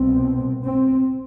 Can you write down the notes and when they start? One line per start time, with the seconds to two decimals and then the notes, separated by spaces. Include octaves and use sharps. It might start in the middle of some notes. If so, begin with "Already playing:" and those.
Already playing: C2 B2 C4
0.65 C4